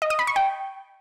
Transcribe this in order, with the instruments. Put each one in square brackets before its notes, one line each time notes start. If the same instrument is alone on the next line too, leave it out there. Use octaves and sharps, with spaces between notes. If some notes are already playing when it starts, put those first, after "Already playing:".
[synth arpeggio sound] D#5
D#6
B5
C#6
G5